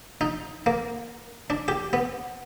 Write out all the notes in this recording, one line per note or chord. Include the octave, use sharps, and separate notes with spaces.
D#4
A#3
D4
G4
B3